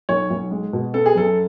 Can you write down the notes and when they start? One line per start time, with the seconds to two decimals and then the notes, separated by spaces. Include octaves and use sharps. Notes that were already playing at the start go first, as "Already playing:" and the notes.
0.09 B1 C#5
0.30 B1
0.51 G#3
0.73 B2
0.94 B3 A4
1.06 G#4
1.15 F#2 A4